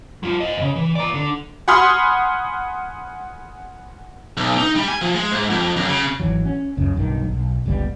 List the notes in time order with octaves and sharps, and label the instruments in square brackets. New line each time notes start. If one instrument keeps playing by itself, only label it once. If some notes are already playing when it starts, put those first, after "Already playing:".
[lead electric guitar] F#3 F4
C5 D#5
E2 C#3
E3
D5 A#5
D3
[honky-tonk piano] F#5 G#5 B5 C6 D#6 F6
[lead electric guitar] B1
D#4
G3
G#5
F3
G#3
G#2
F2
F#2
C#3
[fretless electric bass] G#1 E3 F#3
C#4
C#2 F#2 C#3
B1 G2 D#3
B1
G1 C#2 G3 B3